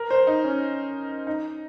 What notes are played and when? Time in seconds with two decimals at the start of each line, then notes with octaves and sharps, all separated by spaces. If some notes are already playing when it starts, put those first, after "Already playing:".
Already playing: A#4
0.11 C5
0.27 D#4
0.44 C#4
1.27 D#4